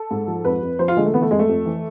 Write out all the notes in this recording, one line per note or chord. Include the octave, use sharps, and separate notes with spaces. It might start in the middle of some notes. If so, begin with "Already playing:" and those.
Already playing: A4
G#2
F3
F2 B4
F2
F3 C5
F4
D3 G#3
A3
E3 B3
A3
F2 G#3
A3
F2
E3